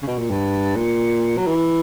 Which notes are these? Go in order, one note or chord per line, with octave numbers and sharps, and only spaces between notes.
C#3
B2
A#2
G2
A#2
F#3
E3